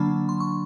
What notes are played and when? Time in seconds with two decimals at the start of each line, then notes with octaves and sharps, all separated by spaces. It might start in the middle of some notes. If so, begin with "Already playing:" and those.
Already playing: D3 F#3 A#3 D4 A5 B5
0.29 C6
0.40 C#6